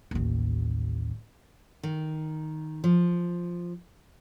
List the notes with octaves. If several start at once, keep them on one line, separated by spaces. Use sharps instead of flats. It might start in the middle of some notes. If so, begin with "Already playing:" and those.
A1 D#2
D#3
F3